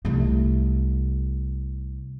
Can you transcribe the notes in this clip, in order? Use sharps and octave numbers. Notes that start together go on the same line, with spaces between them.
C2 A3